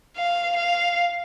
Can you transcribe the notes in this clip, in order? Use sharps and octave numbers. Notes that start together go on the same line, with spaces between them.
F5
F5